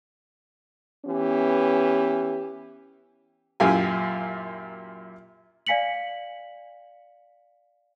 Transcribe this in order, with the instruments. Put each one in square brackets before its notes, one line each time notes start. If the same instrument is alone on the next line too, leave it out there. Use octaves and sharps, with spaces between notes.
[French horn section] E3 B3 C#4 G4
[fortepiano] F#2 A#2 E4 G4 F5 G#5
[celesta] D5 F5 G#5 B6 C#7 F#7